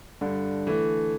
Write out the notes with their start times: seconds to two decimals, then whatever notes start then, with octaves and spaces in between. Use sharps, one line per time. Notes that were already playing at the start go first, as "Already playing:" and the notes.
0.21 G2 D3
0.67 E3 A3